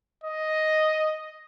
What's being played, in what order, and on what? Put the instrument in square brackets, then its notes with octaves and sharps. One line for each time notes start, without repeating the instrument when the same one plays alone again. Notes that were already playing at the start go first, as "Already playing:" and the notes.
[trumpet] D#5